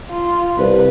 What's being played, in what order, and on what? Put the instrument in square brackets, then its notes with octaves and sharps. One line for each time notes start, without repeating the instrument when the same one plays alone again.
[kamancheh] F4
[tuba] C2 [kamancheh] B4